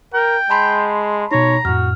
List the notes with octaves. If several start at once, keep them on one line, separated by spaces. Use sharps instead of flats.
A#4 G5
G#3 A5 B5 C6
B2 D#4 C#5 A#5
F2 A2 F#4 F6